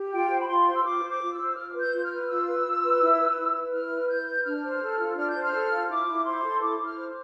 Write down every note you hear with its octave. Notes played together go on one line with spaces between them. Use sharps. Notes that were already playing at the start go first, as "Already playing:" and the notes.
Already playing: G4
F4 G5
C5
B5
F4 C6
C5
E6
F4 D6
C5
D6
F4
E6
C5
F4 F6
B4
G6
F4
F6
B4
F4 E6
B4
F4
B4
E4
B4
E4
B4
E4 F6
B4
E4 G6
B4
D4 F6
C5
A4
F4
D4 F6
G6
C5
F6
A4
F4
E4 D6
E4
C5 C6
A4
E4 D6
E4
F6
C5